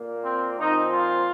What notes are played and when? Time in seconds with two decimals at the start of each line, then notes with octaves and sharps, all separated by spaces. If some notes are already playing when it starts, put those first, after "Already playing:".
Already playing: A#2 A#3
0.23 C4
0.57 A#2 F3 C4 D#4
0.91 F4